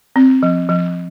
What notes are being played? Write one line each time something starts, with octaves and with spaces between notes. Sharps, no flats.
C4
F3
F3